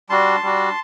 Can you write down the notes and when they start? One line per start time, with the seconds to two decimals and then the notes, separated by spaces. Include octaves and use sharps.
0.10 G3 D4 F#4 A5 C6
0.43 G3 D4 F#4